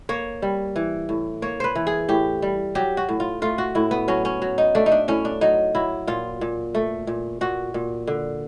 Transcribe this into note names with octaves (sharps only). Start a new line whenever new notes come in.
A#3 C#5
G3
E3
A2
A#3 C#5
B4 C5
E3
G#4
A2 G4
G3
F#3 G4
F#4
A2
F4
A3 F4
F#4
A2 E4
B3
F#3 C#4
C#4
F#3
D#4
A3 D4
D#4
D4
A2 C#4
D4
F#3 D#4
F#3 E4
A#2 F4
A#2
A3
A#2
A#2 F#4
A#2
D3